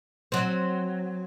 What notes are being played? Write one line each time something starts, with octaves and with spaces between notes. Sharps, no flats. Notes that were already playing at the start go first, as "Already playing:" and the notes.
F#3 C4